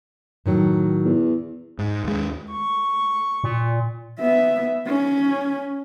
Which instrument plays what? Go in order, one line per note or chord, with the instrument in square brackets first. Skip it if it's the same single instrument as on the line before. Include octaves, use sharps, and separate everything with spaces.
[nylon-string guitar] A2 D#3 F#3
[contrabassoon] E2
[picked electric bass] G#2
D#2 G#3
[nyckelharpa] C#6
[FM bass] A#2
[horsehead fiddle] B3 E5
C#4